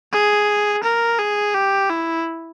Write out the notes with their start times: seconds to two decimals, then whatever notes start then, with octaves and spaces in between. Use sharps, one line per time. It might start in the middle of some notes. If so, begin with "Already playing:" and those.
0.12 G#4
0.83 A#4
1.19 G#4
1.54 G4
1.90 E4